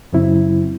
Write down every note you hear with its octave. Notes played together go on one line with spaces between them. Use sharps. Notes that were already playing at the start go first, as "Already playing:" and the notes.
F#2 C#3 F#3 C4 E4